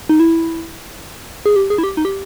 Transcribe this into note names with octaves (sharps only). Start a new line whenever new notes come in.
D#4
E4
G#4
G4
G#4
E4
G4
D#4
G4